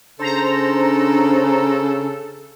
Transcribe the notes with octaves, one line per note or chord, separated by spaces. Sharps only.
C#3 D4 A4 C5 A#5